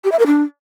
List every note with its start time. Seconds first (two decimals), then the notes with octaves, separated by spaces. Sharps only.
0.04 G4
0.12 E5
0.19 A#4
0.26 D4